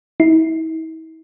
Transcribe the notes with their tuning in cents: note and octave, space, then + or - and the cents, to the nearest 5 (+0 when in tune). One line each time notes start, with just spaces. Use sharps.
E4 -45